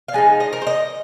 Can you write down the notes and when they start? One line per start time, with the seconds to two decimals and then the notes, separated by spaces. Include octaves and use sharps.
0.08 F5
0.13 F3 G#3 D#4 G#5
0.40 D#5
0.53 A#4
0.62 C5
0.67 D#5